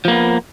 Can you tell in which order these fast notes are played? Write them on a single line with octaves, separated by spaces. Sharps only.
F3 A#3 B3